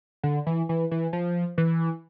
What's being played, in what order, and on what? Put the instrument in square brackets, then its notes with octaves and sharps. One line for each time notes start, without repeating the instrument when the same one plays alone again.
[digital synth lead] D3
E3
E3
E3
F3
E3